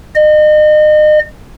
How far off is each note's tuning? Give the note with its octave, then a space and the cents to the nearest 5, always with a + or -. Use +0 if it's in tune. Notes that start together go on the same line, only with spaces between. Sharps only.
D#5 -35